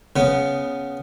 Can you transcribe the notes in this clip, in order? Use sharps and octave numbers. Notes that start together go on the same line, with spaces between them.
C#3 B3